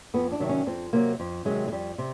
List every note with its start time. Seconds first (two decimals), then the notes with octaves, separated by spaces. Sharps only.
0.14 F2 B3
0.32 D4
0.40 C3 D#3 F#3
0.49 C#4
0.67 F2 C4
0.93 C3 D#3 F#3 A#3
1.20 F2
1.45 C3 D#3 F#3 G#3
1.68 G#3
1.72 F2 G3
1.98 C3